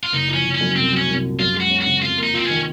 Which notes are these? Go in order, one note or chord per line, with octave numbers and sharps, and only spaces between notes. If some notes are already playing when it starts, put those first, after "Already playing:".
F4
F#1 D#4
F3
C#4
F#1
C#4
F#2
C2 C4
F#3
C#4
C2
A#2
F#2 F4
G#3
F#4
C#4
C#3 F#4
F2 F4
A#3
D#4
C4 F4
C#4
D#3